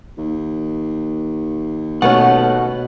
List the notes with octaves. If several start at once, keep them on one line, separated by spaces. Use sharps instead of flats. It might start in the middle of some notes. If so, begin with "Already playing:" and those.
D#2
B2 A3 B3 C#4 F#5